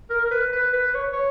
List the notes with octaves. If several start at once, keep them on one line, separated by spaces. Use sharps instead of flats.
A#4
A#4
B4
B4
B4
C#5
C#5